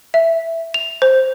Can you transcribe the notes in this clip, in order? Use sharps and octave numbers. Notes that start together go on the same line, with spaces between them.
E5
F7
C5